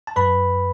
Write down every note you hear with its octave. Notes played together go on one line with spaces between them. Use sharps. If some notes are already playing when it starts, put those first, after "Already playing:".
A5
F#2 B4 B5